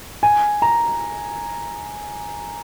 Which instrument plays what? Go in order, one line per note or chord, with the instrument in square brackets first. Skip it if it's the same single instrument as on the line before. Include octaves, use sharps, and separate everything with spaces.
[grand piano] G#5
A#5